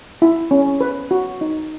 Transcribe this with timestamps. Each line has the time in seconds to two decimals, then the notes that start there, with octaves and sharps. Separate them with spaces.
0.22 E4
0.51 C#4
0.81 B4
1.11 F#4
1.41 D#4